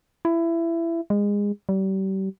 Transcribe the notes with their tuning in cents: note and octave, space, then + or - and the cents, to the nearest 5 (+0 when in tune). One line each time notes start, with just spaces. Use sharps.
E4 +20
G#3 -25
G3 -35